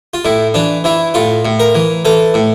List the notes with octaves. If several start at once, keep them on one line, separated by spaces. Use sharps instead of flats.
F4
A2 E4
E3 D4
E3 E4
A2 F4
A2
A#4
E3
E3 A4
A2